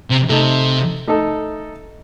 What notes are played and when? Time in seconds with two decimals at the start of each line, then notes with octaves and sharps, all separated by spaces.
0.10 C3
0.29 C3 A3 D#4 A4
1.07 A3 D#4 A4